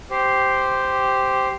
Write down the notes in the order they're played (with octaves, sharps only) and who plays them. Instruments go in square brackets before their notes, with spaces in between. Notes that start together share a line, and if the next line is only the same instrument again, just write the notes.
[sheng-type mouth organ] G4 C5